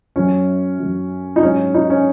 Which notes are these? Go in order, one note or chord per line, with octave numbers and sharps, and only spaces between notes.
F#2 F#3 C#4
F#2 F#3
D#4
G#2 F#3 C#4
D#4
C#4